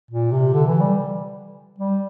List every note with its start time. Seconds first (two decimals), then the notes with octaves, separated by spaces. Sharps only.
0.11 A#2
0.32 C3
0.53 D3
0.67 E3
0.80 G3
1.78 G3